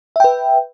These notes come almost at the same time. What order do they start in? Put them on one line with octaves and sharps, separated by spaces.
E5 G5 B4